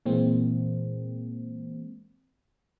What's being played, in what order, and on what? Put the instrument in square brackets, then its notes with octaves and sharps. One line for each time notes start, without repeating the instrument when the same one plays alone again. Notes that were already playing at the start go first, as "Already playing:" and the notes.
[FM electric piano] A#2 E3 G#3 A#3 C4